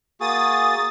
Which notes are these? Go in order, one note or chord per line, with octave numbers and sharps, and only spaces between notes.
A#3 F#4 G#4 D#6 A6